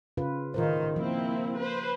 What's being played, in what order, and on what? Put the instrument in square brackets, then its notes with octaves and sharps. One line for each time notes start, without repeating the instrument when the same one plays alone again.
[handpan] C#3 F4 B4
[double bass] A2 D#3 [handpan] F4 A#4 C5
[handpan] F3 [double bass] A#3 [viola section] C4 E4
[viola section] B4 C5